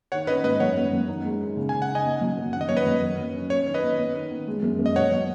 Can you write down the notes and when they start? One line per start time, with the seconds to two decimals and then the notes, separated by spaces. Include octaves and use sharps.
0.12 D#3 C#5 F#5
0.27 C#4 B4 D#5
0.44 G#2 B4 D#5
0.60 F#2 C#5 F#5
0.77 F#2
0.93 F#2
1.08 D#4
1.25 G#3
1.41 D#4
1.56 C#3
1.69 C#3 G#5
1.82 F#5
1.89 D#4
1.95 D#5 G#5
2.06 B3
2.21 F#3
2.37 F#2
2.53 D#3 F#5
2.61 D#5
2.69 F#2 C#5
2.77 B4 D#5
2.86 F#2
3.01 F#2
3.19 F#3
3.35 C#4
3.50 B3 C#5
3.66 D#3
3.74 B4 D#5
3.83 B3
3.98 B3
4.14 D#3
4.31 B3
4.48 G#3
4.63 F#2
4.79 F#2
4.86 D#5
4.96 B2 C#5 F#5
5.12 F#3